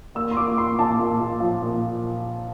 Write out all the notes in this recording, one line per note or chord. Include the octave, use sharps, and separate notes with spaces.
A#3 E6
C6
A#3 D6
A#3 C6
A#2 A5
A#2
A#2
F3
A#2